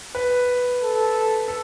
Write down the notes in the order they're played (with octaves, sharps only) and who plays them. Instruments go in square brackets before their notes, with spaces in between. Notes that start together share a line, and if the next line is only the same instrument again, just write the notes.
[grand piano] B4
[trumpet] A4
[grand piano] A4